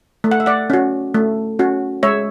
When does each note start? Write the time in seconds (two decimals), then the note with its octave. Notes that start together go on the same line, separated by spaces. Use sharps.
0.24 A3
0.31 F#5
0.40 E5
0.46 D5 F#5
0.70 C#4 F#4
1.14 A3
1.59 C#4 F#4
2.03 G#3 C#5 E5